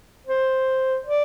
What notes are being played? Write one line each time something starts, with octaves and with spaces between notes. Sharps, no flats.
C5
D5